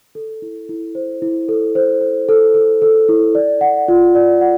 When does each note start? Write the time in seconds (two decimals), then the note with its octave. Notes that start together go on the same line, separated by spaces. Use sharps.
0.15 A4
0.42 E4
0.69 E4
0.95 C5
1.22 E4
1.49 A4
1.75 C5
2.01 C5
2.29 A4
2.54 A4
2.82 A4
3.08 E4
3.35 D5
3.61 F#5
3.88 F4
4.15 D5
4.41 F#5